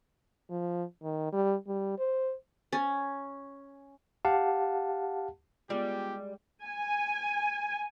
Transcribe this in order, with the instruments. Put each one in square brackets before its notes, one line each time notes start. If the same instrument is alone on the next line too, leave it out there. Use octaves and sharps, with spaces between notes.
[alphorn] F3
D#3
G3
G3
C5
[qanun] C#4
[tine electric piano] G4 F5 F#5 A5
[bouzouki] G3 [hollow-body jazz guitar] G#3 [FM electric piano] B3 F4 [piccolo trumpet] G4
[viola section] G#5